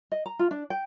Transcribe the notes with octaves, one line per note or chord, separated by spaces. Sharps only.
D#5
A#5
F4
D4
G5